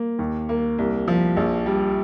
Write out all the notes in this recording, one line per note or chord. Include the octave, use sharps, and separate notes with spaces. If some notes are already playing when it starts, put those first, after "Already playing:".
Already playing: A#3
D#2
A#3
C2
F3
A#1
G3